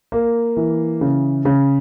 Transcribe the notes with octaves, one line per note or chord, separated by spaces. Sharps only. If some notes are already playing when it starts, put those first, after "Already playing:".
A#3
E3
C#3
C#3